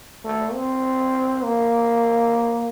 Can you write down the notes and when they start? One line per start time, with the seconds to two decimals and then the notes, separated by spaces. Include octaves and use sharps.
0.25 A3
0.54 C4
1.44 A#3